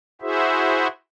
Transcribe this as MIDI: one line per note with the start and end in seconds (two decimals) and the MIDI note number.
0.21 0.88 64
0.21 0.88 66
0.21 0.88 68
0.21 0.88 72
0.21 0.88 76